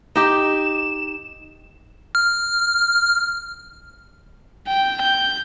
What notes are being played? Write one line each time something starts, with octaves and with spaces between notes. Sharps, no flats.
D#4 G4 E7
F6
G5
G6